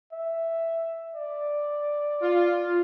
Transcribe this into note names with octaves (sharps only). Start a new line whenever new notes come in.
E5
D5
F4